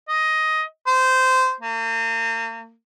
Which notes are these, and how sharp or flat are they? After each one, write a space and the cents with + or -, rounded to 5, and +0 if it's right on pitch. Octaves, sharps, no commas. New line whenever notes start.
D#5 +10
C5 -15
A#3 -40